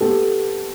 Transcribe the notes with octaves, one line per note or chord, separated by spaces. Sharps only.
B3 G4 A4